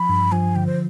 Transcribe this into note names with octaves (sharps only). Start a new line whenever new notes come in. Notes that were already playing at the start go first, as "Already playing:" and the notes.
Already playing: F3 B5
G2
F3 G#5
D3 G5
C5